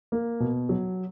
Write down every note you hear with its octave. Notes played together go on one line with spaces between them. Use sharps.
A#3
B2
F#3